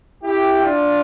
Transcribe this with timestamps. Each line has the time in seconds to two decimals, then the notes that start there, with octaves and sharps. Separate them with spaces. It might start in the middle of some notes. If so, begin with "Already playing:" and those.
0.23 E4 G4
0.62 D4 F4